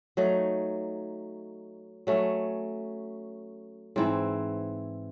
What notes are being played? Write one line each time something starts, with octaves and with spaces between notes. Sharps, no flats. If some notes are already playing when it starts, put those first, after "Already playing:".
F#3 A3 D#4
F#3 A3 C#4
G#2 E3 C4 E4